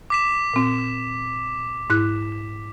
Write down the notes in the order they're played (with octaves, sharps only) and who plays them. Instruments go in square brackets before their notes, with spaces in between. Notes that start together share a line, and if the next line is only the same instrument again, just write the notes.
[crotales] D6 B6 E7
[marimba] A#2 C4
G#2 E4 F#6